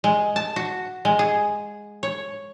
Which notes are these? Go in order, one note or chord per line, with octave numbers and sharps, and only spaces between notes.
G#3
A5
F#4
G#3
G#4
C#5